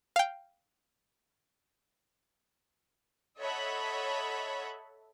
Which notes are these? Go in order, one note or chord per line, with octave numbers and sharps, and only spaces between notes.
F5 G5
A4 C#5 D#5 E5 F#5 B5